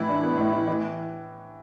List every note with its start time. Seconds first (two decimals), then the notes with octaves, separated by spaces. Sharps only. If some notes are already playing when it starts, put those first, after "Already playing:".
Already playing: A2 E3 E4
0.09 D4
0.23 B3
0.38 A2
0.53 E3
0.68 E3